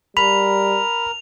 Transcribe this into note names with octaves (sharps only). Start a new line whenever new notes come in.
G3 A#4 B5 F7